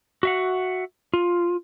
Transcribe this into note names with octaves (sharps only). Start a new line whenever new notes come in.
F#4 E5 F#5
F4